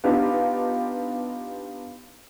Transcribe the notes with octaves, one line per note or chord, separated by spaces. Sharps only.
B3 D4 D#4 F4 G4